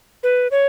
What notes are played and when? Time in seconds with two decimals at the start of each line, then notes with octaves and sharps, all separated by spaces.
0.23 B4
0.51 C#5